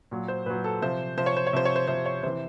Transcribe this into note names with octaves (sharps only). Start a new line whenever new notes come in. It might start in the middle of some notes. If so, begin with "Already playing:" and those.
A#2 F#3
C5
A#2 F#3 B4
A4
C3 F3 C5
C3 F3 C5
C#5
C5
C#5
C3 F3 C5
C#5
C5
C3 F3 C5
C#5
C3 E3 C5